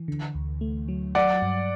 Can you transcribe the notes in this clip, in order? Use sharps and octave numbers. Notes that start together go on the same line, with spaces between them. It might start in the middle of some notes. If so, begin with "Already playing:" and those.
Already playing: E3
D3
D2
A3
F#3
F#3 D5 F#5
G2